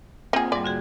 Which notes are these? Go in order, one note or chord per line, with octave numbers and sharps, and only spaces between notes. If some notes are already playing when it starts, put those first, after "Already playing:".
A#3 C4 F4 G#4 F#5
G#2 G3 D5
D3 F#4 G#4